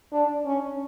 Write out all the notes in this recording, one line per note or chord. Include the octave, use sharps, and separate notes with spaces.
D4
C#4